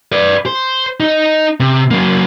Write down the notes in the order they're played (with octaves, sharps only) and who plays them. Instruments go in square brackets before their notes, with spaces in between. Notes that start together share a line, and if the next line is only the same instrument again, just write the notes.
[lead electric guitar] B4 D5
C5
D#4 D#5
C3
F#3 A#3